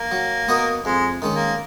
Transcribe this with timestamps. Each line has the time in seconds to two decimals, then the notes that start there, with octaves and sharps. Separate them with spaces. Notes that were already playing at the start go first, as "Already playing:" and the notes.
Already playing: A#3
0.12 F#3
0.48 B3 F#4 A#4 D#5
0.85 F2 G#3
1.22 D#3 G#3 C#4
1.35 A#3